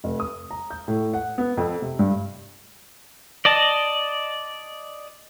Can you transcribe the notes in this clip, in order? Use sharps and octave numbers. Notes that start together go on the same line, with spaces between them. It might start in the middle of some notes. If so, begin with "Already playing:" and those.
F1
D#6
A#5
G6
A2
F#5
B3
F2
C3
G2
D5 D#5 A5